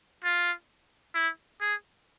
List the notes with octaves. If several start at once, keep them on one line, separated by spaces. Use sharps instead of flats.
F4
E4
G#4